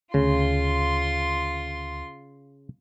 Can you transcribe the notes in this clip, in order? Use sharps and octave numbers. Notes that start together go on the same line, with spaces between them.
D2 C#3 F4 C6